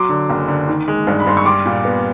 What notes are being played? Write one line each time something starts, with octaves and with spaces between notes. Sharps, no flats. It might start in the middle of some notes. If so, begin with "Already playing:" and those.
Already playing: F#3 C6 D6
D3
F#1
D3
D#3
G#3
G2
B5
G2 C6
C#6
G3 C6 D6
A#2
B3